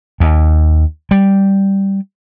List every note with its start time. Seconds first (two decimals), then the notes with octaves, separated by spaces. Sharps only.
0.20 D#2
1.11 G3